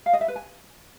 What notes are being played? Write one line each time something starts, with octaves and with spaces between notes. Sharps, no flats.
F5
D#5
E5
B4
G#5